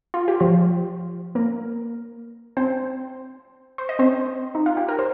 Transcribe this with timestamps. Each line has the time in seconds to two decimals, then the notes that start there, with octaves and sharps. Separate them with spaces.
0.14 F4
0.28 G4
0.40 F3 F4
1.35 A#3 A#4
2.57 C4 C5
3.78 C5
3.89 D#5
3.99 C4 C5
4.55 D#4
4.66 F4
4.77 G4
4.88 A#4
4.99 C5